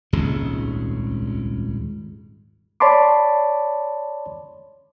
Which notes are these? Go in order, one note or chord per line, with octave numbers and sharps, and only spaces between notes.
D#1 G#1 C#2 C#3
C#5 D5 A5 B5 C6 D6